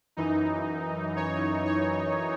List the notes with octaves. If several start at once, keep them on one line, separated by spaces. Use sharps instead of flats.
F#2 E3 D#4
C#5
C#5